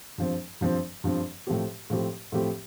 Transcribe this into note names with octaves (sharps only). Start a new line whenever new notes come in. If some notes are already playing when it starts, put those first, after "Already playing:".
G2 F3 C4
G2 F3 C4
G2 F3 C4
A2 F3 A3 C4 G4
A2 F3 A3 C4 G4
A2 F3 A3 C4 G4